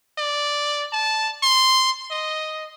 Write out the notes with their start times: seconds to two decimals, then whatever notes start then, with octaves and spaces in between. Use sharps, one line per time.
0.18 D5
0.93 A5
1.43 C6
2.11 D#5